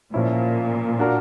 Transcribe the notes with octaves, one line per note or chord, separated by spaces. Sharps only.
A#2 F3 A#3 C#4 E4
A#3 D4 F#4 A#4